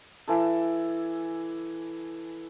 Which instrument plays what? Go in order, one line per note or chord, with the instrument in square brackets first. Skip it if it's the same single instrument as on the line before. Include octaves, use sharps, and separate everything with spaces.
[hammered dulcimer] E3 A4